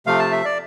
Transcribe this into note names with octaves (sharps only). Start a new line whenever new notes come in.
C3 F3 A3 F5
A5
E5
D5